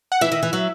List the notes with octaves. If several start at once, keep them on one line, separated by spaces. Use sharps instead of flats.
F#5
E3 E5
D#3
E3
F#3